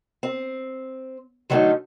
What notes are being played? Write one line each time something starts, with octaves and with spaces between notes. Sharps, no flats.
C4
D3 F#3 G3 A3 C#4 D#4